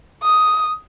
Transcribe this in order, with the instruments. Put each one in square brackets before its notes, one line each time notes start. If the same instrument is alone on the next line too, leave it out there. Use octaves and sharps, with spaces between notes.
[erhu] D#6